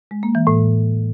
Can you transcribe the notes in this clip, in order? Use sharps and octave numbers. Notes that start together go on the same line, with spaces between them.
G#3
A#3
E3
A2